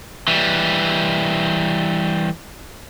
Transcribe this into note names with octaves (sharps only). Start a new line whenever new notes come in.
E3 G3